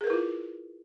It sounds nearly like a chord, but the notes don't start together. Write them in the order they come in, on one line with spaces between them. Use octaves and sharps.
G#4 A#4 B4 E4 F4